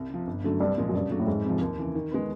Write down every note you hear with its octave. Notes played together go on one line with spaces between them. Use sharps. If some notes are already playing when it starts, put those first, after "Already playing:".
Already playing: C2
C3 F3
G1
F#2 D3 F#3 A3
C2 G2
A#2 F3 G#3
F#2
G2 C#3
F#3 A3 D4 F#4
A2
F1 G#2
F2 C3 F3
D#2
C#3 E3
D#3
G#3 B3